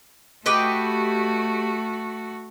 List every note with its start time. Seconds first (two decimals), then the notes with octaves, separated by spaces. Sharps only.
0.46 A3 F#4 G4 B4 D#5